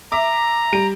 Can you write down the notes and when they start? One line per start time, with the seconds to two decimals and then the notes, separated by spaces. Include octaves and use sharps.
0.12 E5 A#5 D6
0.73 G3 D7